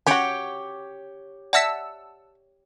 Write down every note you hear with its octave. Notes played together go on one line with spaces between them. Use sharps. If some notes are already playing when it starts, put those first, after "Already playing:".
C#4 F#4 G4 C#5 G5
D5 E5 F#5 A5 E6 B6